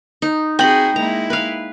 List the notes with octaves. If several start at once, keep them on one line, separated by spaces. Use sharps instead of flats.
D#4
C4 F#4 G#4 D#5 G5 B5
G#3 A#3 E4 A#5
B4 F5